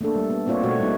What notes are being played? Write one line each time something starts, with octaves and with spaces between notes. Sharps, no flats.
A3 A#3 D4 A4
G3
B3
A#3 C4 F4 C#5 D5
B2 A3 F#4 C#5
G3 A#3 B3 D#4